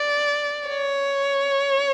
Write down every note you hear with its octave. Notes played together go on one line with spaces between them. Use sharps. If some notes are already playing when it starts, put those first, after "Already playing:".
Already playing: D5
C#5